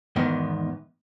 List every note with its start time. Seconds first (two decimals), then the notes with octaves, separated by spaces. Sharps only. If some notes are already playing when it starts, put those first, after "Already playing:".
0.16 E2 G#2 D#3 B3